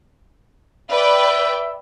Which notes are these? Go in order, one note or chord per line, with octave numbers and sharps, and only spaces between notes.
B4 D5 E5 G5